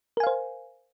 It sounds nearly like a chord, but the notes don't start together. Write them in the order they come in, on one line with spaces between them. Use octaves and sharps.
A#4 G#5 F5 C5